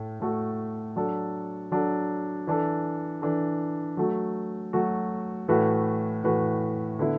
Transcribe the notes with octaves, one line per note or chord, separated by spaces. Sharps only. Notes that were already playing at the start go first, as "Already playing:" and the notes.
Already playing: A2 A3
A2 A3 F#4 A4
F#3 D4 A4
F#3 D4 A4
E3 D4 A4
E3 D4 A4
F#3 A3 F#4
F#3 A3 F#4
A2 E3 A3 F#4 B4
A2 E3 A3 F#4 B4
D3 B3 E4